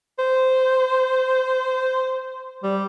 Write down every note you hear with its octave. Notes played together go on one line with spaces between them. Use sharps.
C5
G3